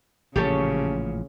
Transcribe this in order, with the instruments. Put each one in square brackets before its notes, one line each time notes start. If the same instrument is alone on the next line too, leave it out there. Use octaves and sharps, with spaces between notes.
[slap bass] A1 A#2 F3 [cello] C#3 [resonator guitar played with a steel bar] G4 A4 C#5